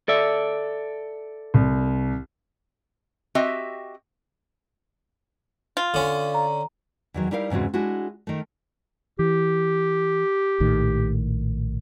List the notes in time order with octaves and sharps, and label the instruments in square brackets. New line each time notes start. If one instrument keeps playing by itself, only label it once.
[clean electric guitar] A4 D5 E5
[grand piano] C2
[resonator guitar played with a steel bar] C4 F#4 G4 D#5 E5
[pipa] F4
[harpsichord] D3 C#4
[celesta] A#5
[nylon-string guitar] E2 D#3 F#3
G3 D#4 E4 A#4 F5
E2 G#2 C#3 C4 F#4
G#3 D4 E4 F#4
D#3 A3
[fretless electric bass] E3 [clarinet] G4
[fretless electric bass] A#1 A2 D#3